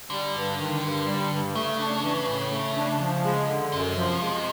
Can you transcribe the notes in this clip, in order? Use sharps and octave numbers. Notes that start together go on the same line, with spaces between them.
D3 G3
G2
D#3
G2
G3
G2
C#3 A3
D4
E3
A2
A3
D4
F3
G#3
D3
F#2 C3
F3
G#3